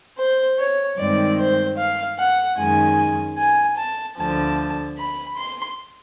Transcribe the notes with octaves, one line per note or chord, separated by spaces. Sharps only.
C5
C#5
G2 D#3 G#3 C4 D5
C5
F5
F#5
F#2 D#3 G#3 C#4 G#5
G#5
A5
D2 D3 F3 A5
B5
C6